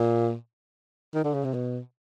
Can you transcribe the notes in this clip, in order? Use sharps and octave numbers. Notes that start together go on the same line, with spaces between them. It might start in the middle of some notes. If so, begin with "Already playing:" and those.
Already playing: A#2
D#3
D3
C#3
C3
B2